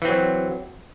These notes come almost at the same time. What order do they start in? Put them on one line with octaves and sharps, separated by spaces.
E3 C4 F#3